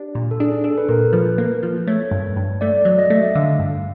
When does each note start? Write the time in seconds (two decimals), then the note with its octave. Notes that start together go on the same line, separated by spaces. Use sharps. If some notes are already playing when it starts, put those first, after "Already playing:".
Already playing: D4 G4
0.15 A#2
0.31 A4
0.40 D4 G#4
0.64 D4 A4
0.78 B4
0.89 A#2 A#4
1.13 F3 B4
1.38 A#3
1.63 F3
1.87 A3 C#5
2.11 G2
2.36 G2
2.61 A3 D5
2.80 D5
2.85 F#3
2.99 D#5
3.10 A3
3.16 E5
3.35 D3 F5
3.59 G2